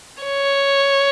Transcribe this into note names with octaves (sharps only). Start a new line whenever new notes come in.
C#5